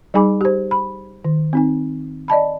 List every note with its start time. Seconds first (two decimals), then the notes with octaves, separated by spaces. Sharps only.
0.14 G3 D#4 G#4 G#5 B5 D6
0.41 G4 C5
0.71 B5
1.25 D#3
1.53 C4 D#4 G#5
2.28 D5 D#5 A5 B5